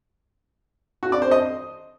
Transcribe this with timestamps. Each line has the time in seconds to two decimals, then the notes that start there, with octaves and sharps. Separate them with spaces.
1.03 F#4
1.12 D5
1.22 C5
1.31 D#5